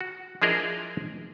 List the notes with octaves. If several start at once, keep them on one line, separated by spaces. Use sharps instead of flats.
F#4
F3 D4 E4 G#4 A#4 D#5